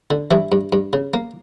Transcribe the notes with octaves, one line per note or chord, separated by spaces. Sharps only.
D3
G2 E3 E4
G2
G2
C#3
A#3